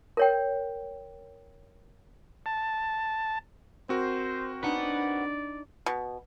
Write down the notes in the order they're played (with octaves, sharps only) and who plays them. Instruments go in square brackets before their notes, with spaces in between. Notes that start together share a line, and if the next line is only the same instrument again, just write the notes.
[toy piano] A#4 C#5 G5
[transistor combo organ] A5
[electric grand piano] C4 F#4 A#4 [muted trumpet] C5
[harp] D4 D#4 [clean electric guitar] B4 F#5 [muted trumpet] D5
[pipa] B2